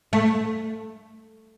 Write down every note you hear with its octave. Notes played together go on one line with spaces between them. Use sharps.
A3